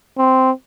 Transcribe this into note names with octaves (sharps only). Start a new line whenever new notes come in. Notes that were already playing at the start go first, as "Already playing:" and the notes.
C4